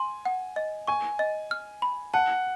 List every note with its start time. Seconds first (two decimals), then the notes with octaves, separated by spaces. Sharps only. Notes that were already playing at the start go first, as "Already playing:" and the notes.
Already playing: G#5 C6
0.25 F#5
0.56 D#5
0.87 G#5 C#6
1.19 D#5
1.51 F6
1.82 B5
2.14 F#5 A5